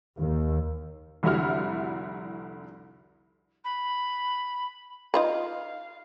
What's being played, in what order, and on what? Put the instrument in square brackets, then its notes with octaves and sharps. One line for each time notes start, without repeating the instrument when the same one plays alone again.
[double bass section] D#2
[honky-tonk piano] F1 C2 D3 E4 F#4 F6
[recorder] B5
[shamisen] D#4 F4 B4 [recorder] F5